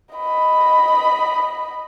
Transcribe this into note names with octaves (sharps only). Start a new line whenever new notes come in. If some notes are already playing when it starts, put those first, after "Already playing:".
D#5 B5